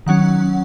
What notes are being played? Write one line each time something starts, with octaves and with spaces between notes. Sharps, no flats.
D#3 F#3 C#4 F#5